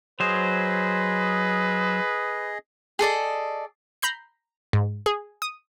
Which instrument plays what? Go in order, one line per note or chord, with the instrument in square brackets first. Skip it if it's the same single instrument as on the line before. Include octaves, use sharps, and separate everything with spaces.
[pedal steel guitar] F#3 C5 [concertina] G#4 D#5 [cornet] B4
[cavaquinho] G#4 A4 D5 D#5
[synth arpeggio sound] A#5 B5 G6 C7
G#2
G#4
D#6